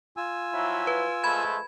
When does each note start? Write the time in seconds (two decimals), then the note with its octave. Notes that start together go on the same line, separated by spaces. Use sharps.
0.17 F4 G#5 E6
0.52 F3 F#3 E4
0.87 B4
1.24 F3 G#3 A3 B5 G#6